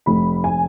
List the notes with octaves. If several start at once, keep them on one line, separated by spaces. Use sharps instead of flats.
F1 B5
G#5